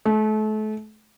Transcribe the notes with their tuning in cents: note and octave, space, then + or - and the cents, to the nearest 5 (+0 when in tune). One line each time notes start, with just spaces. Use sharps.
A3 -35